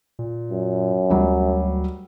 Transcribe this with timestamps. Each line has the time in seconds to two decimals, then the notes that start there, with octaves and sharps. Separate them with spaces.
0.19 A#2
0.51 F#2
1.10 D2 F#3 G3